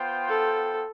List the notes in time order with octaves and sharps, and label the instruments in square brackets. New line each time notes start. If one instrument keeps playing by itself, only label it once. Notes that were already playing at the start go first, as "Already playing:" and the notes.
Already playing: [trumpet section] B3 F4 C5 G5
[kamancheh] A4